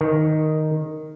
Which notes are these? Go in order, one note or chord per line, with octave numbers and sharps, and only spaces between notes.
D#3